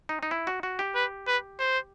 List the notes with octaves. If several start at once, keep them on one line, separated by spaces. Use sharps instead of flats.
D#4
D#4
E4
F#4
F#4
G4
B4
B4
C5